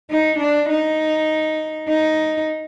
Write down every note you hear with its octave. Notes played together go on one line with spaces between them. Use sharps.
D#4
D4
D#4
D#4